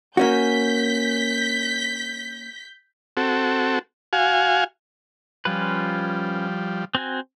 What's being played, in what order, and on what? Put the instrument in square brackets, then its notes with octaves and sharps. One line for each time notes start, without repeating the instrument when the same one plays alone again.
[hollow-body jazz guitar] A#3 C#4 F#4 [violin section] G6 B6
[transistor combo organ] C4 F#4 A4
F#4 F5 G#5
[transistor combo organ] F3 G3 [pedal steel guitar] C#4 F4 B4
[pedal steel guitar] C4 F#4 G#5